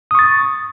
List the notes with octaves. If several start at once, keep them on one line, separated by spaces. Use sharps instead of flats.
C#6 D#6 A6